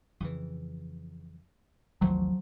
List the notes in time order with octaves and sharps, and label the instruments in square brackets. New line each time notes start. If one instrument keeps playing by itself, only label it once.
[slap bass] F2 C#3 E3
[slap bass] A1 D#2 C3 [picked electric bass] F3 F#3